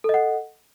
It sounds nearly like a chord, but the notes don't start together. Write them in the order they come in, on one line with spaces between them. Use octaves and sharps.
A4 D#5 F#5